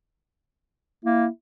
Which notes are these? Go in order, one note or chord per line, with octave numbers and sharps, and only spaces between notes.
A#3 E4